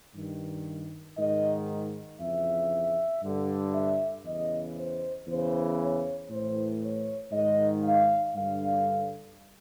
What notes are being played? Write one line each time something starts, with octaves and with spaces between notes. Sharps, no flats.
G2 D#3
G#2 D#3 D#5
F2 C#3 E3 E5
G2 D3
E5
E2 C#3 E3 D#5
C5
E2 C#3 E3 C5
C#5
A2 E3 C5
C#5
G#2 D#3 D#5
F5
G2 D3 F5